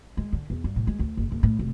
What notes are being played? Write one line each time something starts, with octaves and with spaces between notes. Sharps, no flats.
G#3
D3
E2
G2
A2
G#3
D2
F#1
F#1
A2
F1